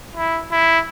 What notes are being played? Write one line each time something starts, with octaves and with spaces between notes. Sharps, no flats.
E4
E4